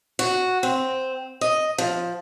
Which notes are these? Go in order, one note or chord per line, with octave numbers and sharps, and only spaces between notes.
F#4
C4
D#5
F3